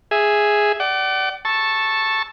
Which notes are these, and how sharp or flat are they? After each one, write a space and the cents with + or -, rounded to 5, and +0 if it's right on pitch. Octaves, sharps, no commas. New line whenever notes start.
G#4 +0 E5 +0
D5 +0 F#5 +40
A5 +0 C#6 -15 E6 +0